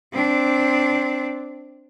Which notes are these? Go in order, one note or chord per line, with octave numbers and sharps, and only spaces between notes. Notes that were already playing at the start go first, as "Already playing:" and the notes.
C4 D4